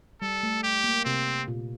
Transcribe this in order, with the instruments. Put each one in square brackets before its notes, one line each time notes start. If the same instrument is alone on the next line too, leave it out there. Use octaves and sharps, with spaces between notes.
[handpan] G3 [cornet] A4
[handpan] A3
[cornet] G4
[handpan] A#3
[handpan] C3 [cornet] C4
[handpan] A#2